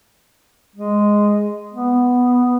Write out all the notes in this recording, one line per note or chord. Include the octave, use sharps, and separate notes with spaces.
G#3
B3